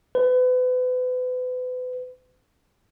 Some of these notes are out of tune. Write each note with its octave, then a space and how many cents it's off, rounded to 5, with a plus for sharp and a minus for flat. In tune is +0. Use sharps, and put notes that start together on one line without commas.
B4 +35